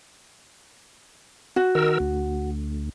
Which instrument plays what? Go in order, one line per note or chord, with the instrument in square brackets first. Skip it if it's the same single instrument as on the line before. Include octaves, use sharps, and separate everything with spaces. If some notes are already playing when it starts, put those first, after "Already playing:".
[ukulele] F#4
[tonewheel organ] D#3 A#4 E6
D2